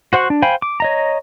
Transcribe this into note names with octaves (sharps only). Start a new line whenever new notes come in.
F#4 C5 F#5 C#6
D4
C5 F5 G5 G#5 B5
D6
C#5 D#5 A#5